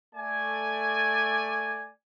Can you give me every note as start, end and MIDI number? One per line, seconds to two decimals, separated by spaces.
0.15 1.91 57
0.15 1.91 74
0.15 1.91 80